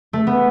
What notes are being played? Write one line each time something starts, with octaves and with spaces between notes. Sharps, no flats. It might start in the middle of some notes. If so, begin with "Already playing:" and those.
A3
B3